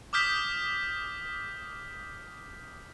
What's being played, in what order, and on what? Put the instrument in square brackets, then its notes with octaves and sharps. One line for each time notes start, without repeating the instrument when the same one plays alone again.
[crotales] D6 D#6 F6 G6 B6